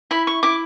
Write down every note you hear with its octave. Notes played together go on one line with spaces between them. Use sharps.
E4 B5
C#6
E4 D6